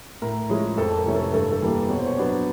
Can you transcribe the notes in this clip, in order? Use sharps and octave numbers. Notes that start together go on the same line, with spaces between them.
A2 A#4
F3 G#3 C#4 E4 G#4
F2 A4
A#4
C3 E3 A3 C#4
A4
G2 A4
A4
E3 G3 A#3
B2 C#5
C5
C#5
F#3 B3 D4